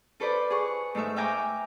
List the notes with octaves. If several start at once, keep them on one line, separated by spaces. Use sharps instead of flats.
F4 A4 B4 C5 D5
G#4 F#5 C#6
G#2 G#3 A3 E5
E5 F5 G5 G#5 A#5 D6